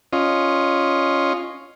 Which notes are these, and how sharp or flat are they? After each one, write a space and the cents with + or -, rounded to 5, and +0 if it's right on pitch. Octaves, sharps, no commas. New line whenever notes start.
C#4 +0 F4 +0 D#5 -10